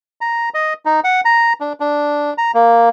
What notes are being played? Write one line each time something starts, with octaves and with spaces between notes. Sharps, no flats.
A#5
D#5
D#4
F#5
A#5
D4
D4
A#5
A#3